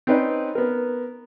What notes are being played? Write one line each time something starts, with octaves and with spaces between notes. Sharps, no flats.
C4 C#4 D#4 B4 D5
B3 A#4